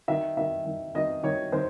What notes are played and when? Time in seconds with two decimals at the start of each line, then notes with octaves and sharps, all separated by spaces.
0.08 D#3 E5
0.37 D#3 E5
0.66 D#3
0.95 D#3 D#5
1.23 D#3 C#5
1.52 D#3 C5